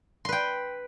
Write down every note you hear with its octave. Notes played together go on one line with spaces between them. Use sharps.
B4 G5 C6